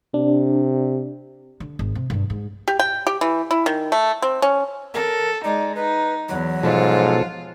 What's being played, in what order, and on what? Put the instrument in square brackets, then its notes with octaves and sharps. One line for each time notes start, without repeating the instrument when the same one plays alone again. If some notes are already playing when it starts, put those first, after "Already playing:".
[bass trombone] C3 [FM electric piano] D4
[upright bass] D3
G#1
C3
G2 C3
G#2
[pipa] G4
G5
G4
E3
E4
D#3
A3
C4
C#4
[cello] A4 [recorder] A#4
[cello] G#3 D#4 [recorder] D5
[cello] D#4 [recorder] B4
[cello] E2 [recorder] F#3
[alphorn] G#2 [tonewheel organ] B2 F3 A4 [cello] F4